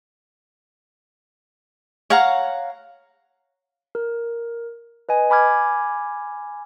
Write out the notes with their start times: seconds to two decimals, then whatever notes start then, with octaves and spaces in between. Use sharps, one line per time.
2.10 C#5 F5 F#5 A#5
3.95 A#4
5.09 B4 D#5 G#5
5.30 G#5 B5 D6 F6 G#6